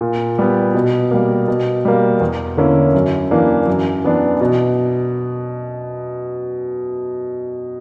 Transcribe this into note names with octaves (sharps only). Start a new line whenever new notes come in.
A#2
G3 B3
B2
G3 A#3
B2
G3 A#3
E2
D3 A#3 C#4 E4
F#2
E3 A#3 D4
F#2
E3 B3 D4
B2